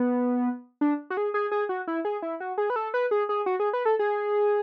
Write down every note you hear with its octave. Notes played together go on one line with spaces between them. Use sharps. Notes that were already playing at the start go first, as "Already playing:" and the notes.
Already playing: B3
D4
F#4
G#4
G#4
G#4
F#4
E4
G#4
E4
F#4
G#4
B4
A4
B4
G#4
G#4
F#4
G#4
B4
A4
G#4